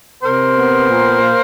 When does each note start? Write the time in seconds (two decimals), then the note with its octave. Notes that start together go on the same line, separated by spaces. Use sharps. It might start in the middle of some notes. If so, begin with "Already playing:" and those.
0.23 C3 A#4 C5
0.55 B3
0.88 A#2
1.20 A#3